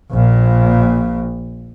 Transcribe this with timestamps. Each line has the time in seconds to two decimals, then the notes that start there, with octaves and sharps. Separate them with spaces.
0.12 A#1 A#2